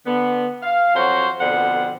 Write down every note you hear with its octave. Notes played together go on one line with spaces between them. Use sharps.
D3 B3
F5
F2 F#3 F#4 C5 C#5 F#5
F2 B2 D3 B3 C4 F#5